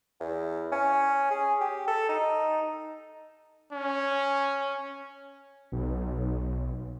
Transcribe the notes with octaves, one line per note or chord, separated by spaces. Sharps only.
E2
C#4
G#4
G4
A4
D#4
C#4
B1